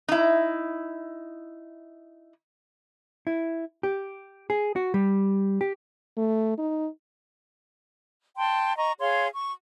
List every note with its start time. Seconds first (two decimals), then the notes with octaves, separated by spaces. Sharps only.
0.08 D#4 E4
3.27 E4
3.83 G4
4.50 G#4
4.76 F#4
4.94 G3
5.61 G4
6.17 A3
6.58 D#4
8.37 G5 A5 C6
8.77 D#5 A#5 C#6
9.00 G#4 C#5 F5 C6
9.34 C#6